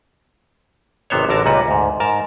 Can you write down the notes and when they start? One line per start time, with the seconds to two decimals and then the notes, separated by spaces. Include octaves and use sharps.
1.10 G#1 C3 B3 C5 C#5
1.29 A1 D3 F#4 A#4 A5
1.46 C#2 A#2 G3 F#4 B4
1.68 D2 G#2
2.00 G#2 A#4 A5